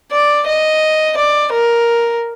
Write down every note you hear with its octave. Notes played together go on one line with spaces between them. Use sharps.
D5
D#5
D5
A#4